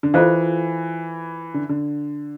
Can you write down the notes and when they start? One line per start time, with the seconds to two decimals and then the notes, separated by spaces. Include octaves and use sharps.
0.03 D3
0.14 E3 F4 A4 C5 F5
1.54 D3
1.69 D3